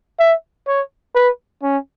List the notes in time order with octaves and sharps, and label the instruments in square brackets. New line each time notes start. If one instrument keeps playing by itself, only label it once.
[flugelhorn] E5
C#5
B4
C#4